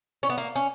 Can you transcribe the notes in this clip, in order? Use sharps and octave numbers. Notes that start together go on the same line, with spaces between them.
C#4
B3
A#3
C#4